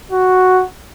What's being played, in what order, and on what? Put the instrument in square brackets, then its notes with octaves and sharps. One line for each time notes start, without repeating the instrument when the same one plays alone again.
[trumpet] F#4